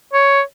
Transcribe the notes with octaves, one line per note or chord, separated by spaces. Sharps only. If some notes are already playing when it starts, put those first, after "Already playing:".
C#5